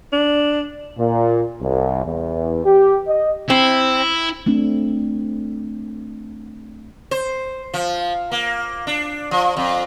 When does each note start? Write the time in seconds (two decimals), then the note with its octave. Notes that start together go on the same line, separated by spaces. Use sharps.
0.12 D4
0.98 A#2
1.61 C2
2.05 E2
2.65 G4
3.07 D#5
3.50 C4 E4
4.46 A3 C4 D4
7.11 C5
7.74 F3
8.31 A#3
8.87 D4
9.31 F3
9.57 F2